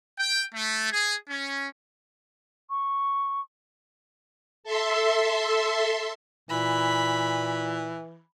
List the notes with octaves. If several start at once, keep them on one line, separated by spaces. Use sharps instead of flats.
G5
A3
G#4
C#4
C#6
A4 E5 C6
A#2 E3 B5